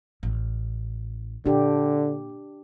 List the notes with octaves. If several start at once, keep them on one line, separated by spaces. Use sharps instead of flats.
A1
A#2 D3 D4 G4